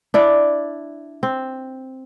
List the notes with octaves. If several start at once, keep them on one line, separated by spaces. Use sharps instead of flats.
D4 E4 D5
C4